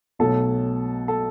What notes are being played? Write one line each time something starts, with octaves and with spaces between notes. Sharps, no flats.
B1 B2 F#3 A3 A4
A4